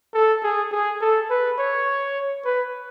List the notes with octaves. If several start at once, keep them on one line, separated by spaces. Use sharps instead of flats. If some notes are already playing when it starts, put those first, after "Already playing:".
A4
G#4
G#4
A4
B4
C#5
B4